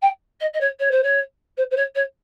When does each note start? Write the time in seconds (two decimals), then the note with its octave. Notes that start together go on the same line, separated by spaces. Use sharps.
0.02 G5
0.40 D#5
0.53 D#5
0.60 C#5
0.79 C#5
0.91 C5
1.03 C#5
1.57 C5
1.71 C5
1.76 C#5
1.95 C#5